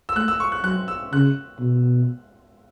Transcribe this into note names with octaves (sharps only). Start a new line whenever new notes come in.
E6
A3 F#6
E6
C#6
F#6
F#3 F#6
E6
C#3 F#6
B2